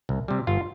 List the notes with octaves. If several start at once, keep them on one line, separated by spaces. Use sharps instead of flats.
C2
C3 G3
G1 F4